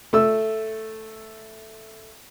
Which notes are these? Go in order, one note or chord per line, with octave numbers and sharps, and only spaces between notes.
A3 E6